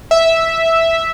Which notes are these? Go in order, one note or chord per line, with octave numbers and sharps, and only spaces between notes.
E5